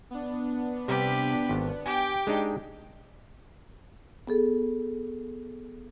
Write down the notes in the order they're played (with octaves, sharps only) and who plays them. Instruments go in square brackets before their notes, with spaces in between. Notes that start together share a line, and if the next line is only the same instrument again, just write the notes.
[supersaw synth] B3 D4
[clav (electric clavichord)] C3 G3 [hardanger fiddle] G4 B4
[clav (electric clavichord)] G#1
[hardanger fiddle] G4 G5 [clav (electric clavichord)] G#5
[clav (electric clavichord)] G#3 D4 D#4
[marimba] B3 G#4 A4